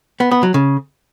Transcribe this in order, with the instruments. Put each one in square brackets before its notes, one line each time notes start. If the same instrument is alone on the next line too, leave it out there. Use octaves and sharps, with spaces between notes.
[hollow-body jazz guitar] B3
B3
F#3
C#3